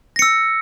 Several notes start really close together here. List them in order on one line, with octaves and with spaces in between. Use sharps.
A#6 C#7 E6